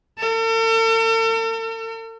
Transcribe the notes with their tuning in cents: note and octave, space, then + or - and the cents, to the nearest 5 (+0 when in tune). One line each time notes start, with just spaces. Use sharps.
A4 +45